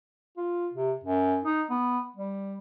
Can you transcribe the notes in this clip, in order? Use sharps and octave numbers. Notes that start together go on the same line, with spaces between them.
F4
C3
F#2
D#4
B3
G3